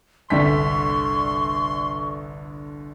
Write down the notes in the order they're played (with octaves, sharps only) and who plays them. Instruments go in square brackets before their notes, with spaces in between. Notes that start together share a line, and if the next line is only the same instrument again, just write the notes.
[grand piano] G1 C2 G5 [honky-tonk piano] D3 B6 [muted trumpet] C6 [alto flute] C#6